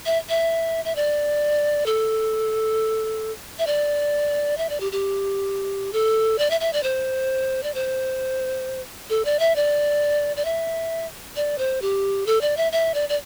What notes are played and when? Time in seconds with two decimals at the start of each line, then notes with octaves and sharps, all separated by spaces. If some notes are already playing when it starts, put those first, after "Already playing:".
0.06 E5
0.29 E5
0.85 E5
0.96 D5
1.86 A4
3.59 E5
3.67 D5
4.58 E5
4.70 D5
4.80 G4
4.92 G4
5.93 A4
6.38 D5
6.50 E5
6.61 E5
6.73 D5
6.83 C5
7.63 D5
7.74 C5
9.10 A4
9.25 D5
9.39 E5
9.56 D5
10.37 D5
10.45 E5
11.36 D5
11.58 C5
11.82 G4
12.26 A4
12.41 D5
12.57 E5
12.72 E5
12.94 D5
13.09 D5